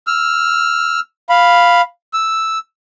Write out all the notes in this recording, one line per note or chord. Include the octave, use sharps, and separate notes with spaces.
E6 F6
F5 B5
E6